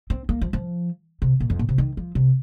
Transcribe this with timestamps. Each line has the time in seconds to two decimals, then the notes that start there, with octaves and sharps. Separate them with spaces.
0.10 C4
0.29 A#3
0.41 F3
0.53 F3
1.22 C3
1.40 A#2
1.50 F2
1.59 A#2
1.69 C3
1.78 D#3
1.97 F3
2.15 C3